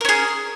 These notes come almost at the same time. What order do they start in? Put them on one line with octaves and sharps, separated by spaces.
A#4 C#4 G#4